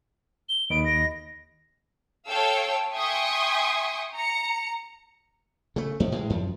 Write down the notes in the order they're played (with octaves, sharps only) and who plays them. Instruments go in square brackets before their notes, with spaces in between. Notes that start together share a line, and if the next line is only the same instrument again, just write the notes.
[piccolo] G7
[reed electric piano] D#2 D#5 B5 [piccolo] D7
[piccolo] A#6
[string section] A4 C#5 F5 G5 E6
E5 G5 G#5 C6 C#6 D#6
A#5 C#7
[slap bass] C#3 A3
F2 A2
A2 E3 G#3
F#2 F3